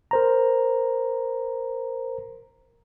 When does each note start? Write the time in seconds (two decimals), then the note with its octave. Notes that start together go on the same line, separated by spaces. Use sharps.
0.11 A#4 C5 A#5